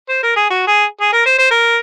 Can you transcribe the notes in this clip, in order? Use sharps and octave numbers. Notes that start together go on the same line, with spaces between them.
C5
A#4
G#4
F#4
G#4
G#4
A#4
C5
C5
A#4